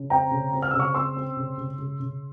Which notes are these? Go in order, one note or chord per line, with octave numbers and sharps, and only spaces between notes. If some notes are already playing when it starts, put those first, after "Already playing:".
Already playing: C#3
C4 G5 A#5
C#3
C4
F6
C#3 E6
C#6 F6
C4 C6 E6
C4
C#3
C#3
C#3
C#3